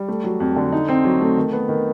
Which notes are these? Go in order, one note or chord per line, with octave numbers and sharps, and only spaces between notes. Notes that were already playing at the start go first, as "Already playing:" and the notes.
Already playing: G3
A3
F#3
F2
D3
D#4
C4
F#3
A3
D#3
B3
D#3